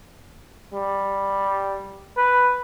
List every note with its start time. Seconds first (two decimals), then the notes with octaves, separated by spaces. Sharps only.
0.73 G3
2.17 B4